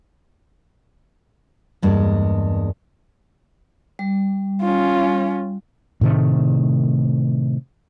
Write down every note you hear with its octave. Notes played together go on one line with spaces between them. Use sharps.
E2 G2 G#3 A#3
G3
C#4 F4
A2 C3 D#3 A3